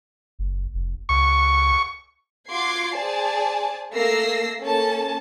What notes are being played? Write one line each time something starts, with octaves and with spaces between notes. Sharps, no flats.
F#1
F1
C#2 C#6
F4 F#4 C6 D6 G#6 C7
G#4 C5 D5 G#5 A5
A3 A#3 A4 E6 A#6 C7
A#3 C#4 A4 A5